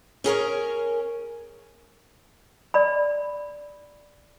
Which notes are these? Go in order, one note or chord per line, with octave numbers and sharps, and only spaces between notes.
C#4 G#4 A#4 C#5
D5 B5